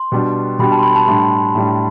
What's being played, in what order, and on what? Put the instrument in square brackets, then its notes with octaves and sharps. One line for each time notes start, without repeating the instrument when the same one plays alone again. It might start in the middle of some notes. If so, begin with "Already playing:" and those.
Already playing: [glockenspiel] C6
[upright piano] B2 G3 D4 G4
[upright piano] B2 G3 D4 G4 [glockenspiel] B5
[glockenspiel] A5
C6
B5
A5
[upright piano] A2 G3 D4 [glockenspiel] C6
[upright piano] A2 G3 D4